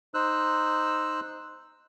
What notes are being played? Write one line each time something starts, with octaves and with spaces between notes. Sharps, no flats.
D#4 C5 E6 F#6